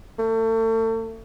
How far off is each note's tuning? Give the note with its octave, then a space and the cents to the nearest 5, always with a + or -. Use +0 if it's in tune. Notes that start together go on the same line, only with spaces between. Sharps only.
A3 +35